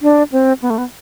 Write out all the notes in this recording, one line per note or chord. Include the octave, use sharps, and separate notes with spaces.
D4
C4
B3
A3
B3